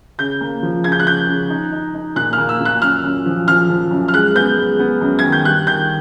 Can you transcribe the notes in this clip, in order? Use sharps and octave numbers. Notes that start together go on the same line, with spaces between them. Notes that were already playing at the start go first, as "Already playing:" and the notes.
C#3 G6
A#3
F3
C#3 G#6
G6
F#6
C#3 G6
C#3
D#4
D#4
D#4
A#2 F#6
F6
A#3
E6
A#2
F#6
F#2 F6
F#2
F3
F3 F6
F3
F#2
F6
G#3 F#6
B3 G6
G#3
B3
F#2
D#3 G#6
G6
G2 F#6
D#3 G6